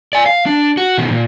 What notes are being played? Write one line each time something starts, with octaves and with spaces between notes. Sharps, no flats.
D5 G#5
F5
D4
F#4
B2 D#3
A#2